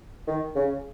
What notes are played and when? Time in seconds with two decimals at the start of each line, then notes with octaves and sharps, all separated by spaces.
0.27 D#3
0.56 C#3